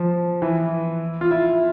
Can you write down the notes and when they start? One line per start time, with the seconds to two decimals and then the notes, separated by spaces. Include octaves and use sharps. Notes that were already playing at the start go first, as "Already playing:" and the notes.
Already playing: F3
0.42 E3
1.21 F4
1.31 E4